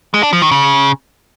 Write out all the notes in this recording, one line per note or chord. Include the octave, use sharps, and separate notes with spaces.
G#3
D4
F3
D#3
C#3